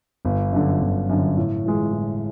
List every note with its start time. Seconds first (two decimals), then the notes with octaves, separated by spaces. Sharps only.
0.25 G1
0.52 F#2 D3
0.81 G1
1.09 F#2 D3
1.37 A2
1.65 E3 G#3
1.93 A2